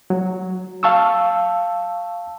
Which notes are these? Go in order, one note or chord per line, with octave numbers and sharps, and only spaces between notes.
F#3
F5 A5 C#6 E6